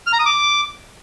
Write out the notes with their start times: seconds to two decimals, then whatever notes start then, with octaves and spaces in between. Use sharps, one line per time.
0.07 F6
0.13 A#5
0.19 D#6
0.26 D6